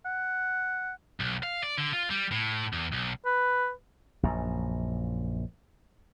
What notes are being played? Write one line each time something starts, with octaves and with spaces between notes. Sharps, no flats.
F#5
B1
F5
D5
D3
F4
G3
A2
E2
B1
B4
A#1 F#2